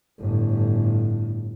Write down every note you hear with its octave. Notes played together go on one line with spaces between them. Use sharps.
G1 A2